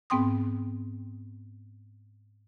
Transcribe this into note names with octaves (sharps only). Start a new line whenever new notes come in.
G#2 B3 C4 G5 C6 D#6